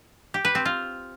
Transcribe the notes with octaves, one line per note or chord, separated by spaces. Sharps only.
G4
B4
C4
F4